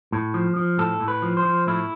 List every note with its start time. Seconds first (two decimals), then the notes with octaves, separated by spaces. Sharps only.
0.12 A2
0.34 F3
0.56 F3
0.78 A2 A4
1.00 A2
1.08 B4
1.22 F3
1.37 C5
1.45 F3
1.67 A2 E4